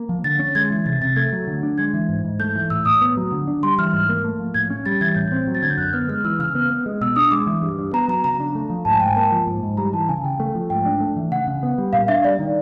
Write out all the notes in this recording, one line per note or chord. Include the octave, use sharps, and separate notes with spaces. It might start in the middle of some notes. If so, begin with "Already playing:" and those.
Already playing: A#3
F3
D3 A6
C#4
G#3 G#6
E3
C3 A6
C3 A6
A3 G#6
F#3
D3
D4
G#3 G#6
E3
G#2
G#2
A3 G6
E3
A2 E6
A2 D#6
B3
F#3
D3
D4
G3 C6
E3 F6
G#2
A#3
A3
F3
A2 G#6
C#4
G3 A6
E3 G#6
A2 G6
C4
F#3
A6
D3 G#6
G6
F#2 F#6
B3 F6
G#3 F6
E3 E6
C#3 F6
B3
B3
G#3
B2 E6
D4 D#6
G#3 D6
E3
G2
G2
B3 A#5
F#3 A#5
C#3 A#5
D4
A3
F3
G#2 A5
G#5
G#2 G5
G#5
A#3 A5
F3
G#2
G#2
G3 A#5
E3 A5
C#3 G#5
C#3 G5
A3
F3
G#2 G5
D4
A3
E3
C#3 F#5
C#3
B3
G3
A#2 F5
D4 E5
G3 D5
D#3